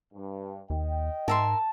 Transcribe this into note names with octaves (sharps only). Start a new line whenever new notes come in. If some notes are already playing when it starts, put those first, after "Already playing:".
G2
D#2 D#5 G5
G#2 A#4 E5 A5 C6